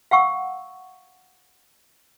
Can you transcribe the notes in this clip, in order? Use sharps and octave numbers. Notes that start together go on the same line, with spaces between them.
F5 F#5 C#6 E6